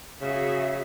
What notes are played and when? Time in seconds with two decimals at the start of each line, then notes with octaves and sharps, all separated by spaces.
0.22 C#3 F#4 G#4 E5